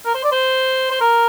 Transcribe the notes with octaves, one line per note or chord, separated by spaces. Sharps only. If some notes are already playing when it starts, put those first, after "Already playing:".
A#4
C5
D5
C5
C5
A#4